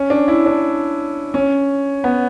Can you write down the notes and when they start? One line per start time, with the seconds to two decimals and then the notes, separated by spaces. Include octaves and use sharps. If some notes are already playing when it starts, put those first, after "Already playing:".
Already playing: C#4
0.10 D4
0.28 E4
0.46 D4
1.34 C#4
2.04 B3